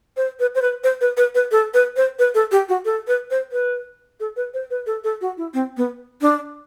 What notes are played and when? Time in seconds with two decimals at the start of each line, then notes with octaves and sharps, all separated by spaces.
0.17 C5
0.40 B4
0.55 C5
0.62 B4
0.84 C5
1.01 B4
1.17 B4
1.35 B4
1.51 A4
1.74 B4
1.96 C5
2.19 B4
2.35 A4
2.52 G4
2.69 F#4
2.85 A4
3.07 B4
3.31 C5
3.52 B4
4.20 A4
4.36 B4
4.54 C5
4.70 B4
4.86 A4
5.04 A4
5.21 F#4
5.37 E4
5.54 C4
5.77 B3
6.21 D4